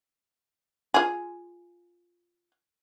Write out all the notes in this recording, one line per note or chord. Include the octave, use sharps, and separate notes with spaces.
F4 G#4